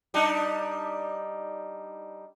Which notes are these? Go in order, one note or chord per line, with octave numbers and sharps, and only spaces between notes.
G3 D4 D#4